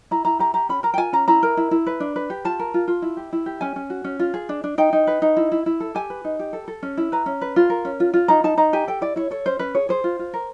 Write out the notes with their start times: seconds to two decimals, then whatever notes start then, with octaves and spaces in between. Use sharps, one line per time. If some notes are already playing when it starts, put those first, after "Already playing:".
0.11 E4 A#5
0.25 E4 A#5
0.39 G4 A#5
0.54 G4 A#5
0.69 C#4 B5
0.83 A#4 A#5
0.94 G5
0.98 F4 G#5
1.13 C#4 A#5
1.28 E4 A#5
1.43 A#4
1.57 E4
1.71 E4
1.86 B4
2.00 D4
2.16 B4
2.30 G4
2.45 F4 A5
2.59 A#4
2.74 F4
2.88 F4
3.02 E4
3.17 G4
3.33 E4
3.46 G4
3.61 C#4 G#5
3.76 C#4
3.90 F#4
4.04 C#4
4.19 F4
4.34 G#4
4.49 D4
4.64 D4
4.78 D#4 G5
4.93 D#4
5.07 B4
5.22 D#4
5.37 E4
5.52 E4
5.66 E4
5.80 A4
5.95 G4 G#5
6.10 B4
6.25 D#4
6.39 G4
6.53 A4
6.68 A4
6.83 C#4
6.97 E4
7.12 B4 A#5
7.26 C#4
7.41 B4
7.56 F4
7.70 A#4
7.85 C#4
8.00 F4
8.14 F4
8.28 D#4 A#5
8.44 D#4 A5
8.57 D#4 A#5
8.73 G4 G#5
8.87 A4 G5
9.01 E4 D5
9.16 E4 C#5
9.31 A4 C#5
9.46 C#4 C5
9.59 C#4 B4
9.75 G#4 C#5
9.89 G#4 C5
10.04 F4
10.19 F4
10.34 A#4